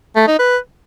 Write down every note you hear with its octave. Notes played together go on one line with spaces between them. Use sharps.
A3
D#4
B4